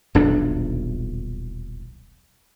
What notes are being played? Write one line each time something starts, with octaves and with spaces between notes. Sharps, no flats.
D#1 B1 E2 D4